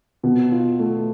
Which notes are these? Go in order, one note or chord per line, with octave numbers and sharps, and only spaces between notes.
B2
F4
A3